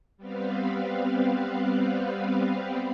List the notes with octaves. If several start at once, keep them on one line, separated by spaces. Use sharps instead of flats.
G3 B3 C4 B4 F5